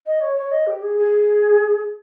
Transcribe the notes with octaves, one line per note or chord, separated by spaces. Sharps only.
D#5
C#5
C#5
D#5
G4
G#4
G#4